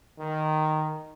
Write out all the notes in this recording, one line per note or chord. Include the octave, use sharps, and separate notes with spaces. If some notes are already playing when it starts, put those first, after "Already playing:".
D#3